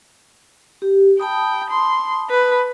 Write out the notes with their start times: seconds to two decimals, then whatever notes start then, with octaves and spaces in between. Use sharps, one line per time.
0.82 G4
1.20 G5 A5 B5 D#6
1.70 C6
2.30 B4